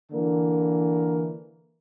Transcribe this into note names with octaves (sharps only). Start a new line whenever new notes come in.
D3 E3 A#3 A#4